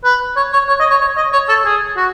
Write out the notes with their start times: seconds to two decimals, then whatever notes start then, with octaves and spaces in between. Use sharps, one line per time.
0.05 B4
0.36 C#5
0.53 C#5
0.68 C#5
0.80 D#5
0.90 C#5
1.01 C#5
1.17 D#5
1.33 C#5
1.49 A4
1.65 G#4
1.97 F#4